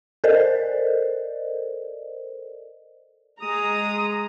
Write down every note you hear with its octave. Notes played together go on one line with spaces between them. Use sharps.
A4 A#4 C5 D5 D#5
G#3 A#5 D#6